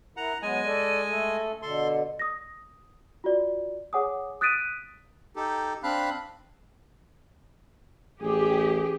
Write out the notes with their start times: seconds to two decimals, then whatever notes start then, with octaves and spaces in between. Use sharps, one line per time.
0.17 E4 A#4 F#5 A#5
0.42 F#3 G#3 B3 D#5 G#5
0.65 A4 D5
1.08 A3 A4
1.62 B2 D3 A4 C6
2.19 D#6 A#6
3.24 F4 F#4 D5
3.93 G#4 C#5 F#5 G#5 D6 D#6
4.41 D#6 F#6 A6 B6 D7 D#7
5.36 D#4 G4 A4
5.83 C4 D4 F5 B5 F#6
8.22 A1 G4 G#4